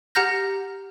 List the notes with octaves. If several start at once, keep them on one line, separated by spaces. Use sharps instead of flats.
G4 F#5 A#5 F6 G6 A#6